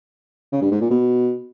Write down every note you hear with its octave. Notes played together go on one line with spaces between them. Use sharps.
C#3
G2
G#2
A#2
B2